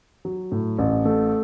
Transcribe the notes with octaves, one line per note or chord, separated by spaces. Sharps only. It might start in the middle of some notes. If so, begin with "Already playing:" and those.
F#3
A2
A1
A3